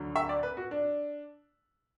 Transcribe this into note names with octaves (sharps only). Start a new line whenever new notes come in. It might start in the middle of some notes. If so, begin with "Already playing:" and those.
Already playing: D2 D3 F#3
E5
D5
B4
F#4
D4